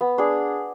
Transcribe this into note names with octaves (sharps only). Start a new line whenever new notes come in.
B3
D4 G#4